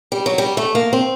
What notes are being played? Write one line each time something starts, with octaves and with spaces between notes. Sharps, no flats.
G3
F#3
G3
A3
A#3
C4